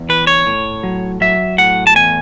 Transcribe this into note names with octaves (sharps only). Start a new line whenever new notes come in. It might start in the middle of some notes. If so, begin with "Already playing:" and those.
Already playing: E2
E3 B4
C#5
A2
F#3
F#3 E5
A2 F#5
A5
E2 G#5